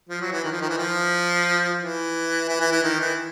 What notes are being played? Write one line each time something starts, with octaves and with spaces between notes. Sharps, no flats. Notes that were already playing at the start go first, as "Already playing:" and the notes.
F3
F#3
E3
D#3
F3
D#3
E3
F3
E3
E3
E3
E3
D#3
E3